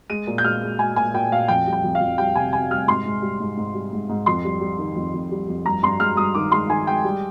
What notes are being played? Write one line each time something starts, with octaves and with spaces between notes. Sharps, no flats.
G#3 D#7
A#2
G6
G#3 F6
G#3
G#3 G#5
A#2 G#5
A#2 G5
A#2 F5
F2 G5
G3
G5
F2
F5
F2
G3 G5
C3 G#5
C3 G#5
G3 F6
G#2 C6
G#2
G3
G#2
G#2
G3
G#2
G#2
F2 C6
G3
G3
D#3
F2
F2
G3
F2
G2 A#5
G2 C6
G#3 F6
G2 D#6
D#3 D6
G#3 C6
D#3 G#5
G#3 G5
G3